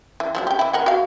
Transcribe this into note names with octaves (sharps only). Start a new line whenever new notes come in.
E3
F3 F#3 D4
G4 G5
E3 E4
A#4 F#5 G5
F#4 F5